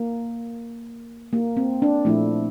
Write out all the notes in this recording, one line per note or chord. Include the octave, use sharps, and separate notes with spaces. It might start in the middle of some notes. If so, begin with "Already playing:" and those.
Already playing: A#3
A#3
C4
D4
A#2 F3 A3 E4